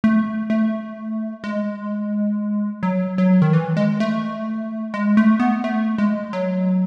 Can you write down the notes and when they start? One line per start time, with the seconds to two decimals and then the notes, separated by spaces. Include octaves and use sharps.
0.04 A3
0.50 A3
1.44 G#3
2.83 F#3
3.18 F#3
3.42 D#3
3.53 E3
3.77 G#3
4.00 A3
4.94 G#3
5.17 A3
5.40 B3
5.64 A3
5.98 G#3
6.33 F#3